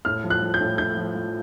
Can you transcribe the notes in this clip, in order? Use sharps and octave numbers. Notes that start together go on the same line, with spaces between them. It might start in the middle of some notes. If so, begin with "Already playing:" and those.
A2 F6
F3
F#6
F3
G6
A2
A2 G6
F3
F3